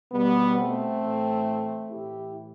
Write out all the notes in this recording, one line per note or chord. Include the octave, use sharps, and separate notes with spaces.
B2 G3 B3
A3 C4
A2 E3
A2 E3 E4 G4